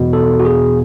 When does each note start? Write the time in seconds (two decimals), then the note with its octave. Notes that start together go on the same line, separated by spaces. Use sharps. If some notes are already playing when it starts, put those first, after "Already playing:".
Already playing: E2 B2
0.13 A4
0.40 F#4
0.45 G#4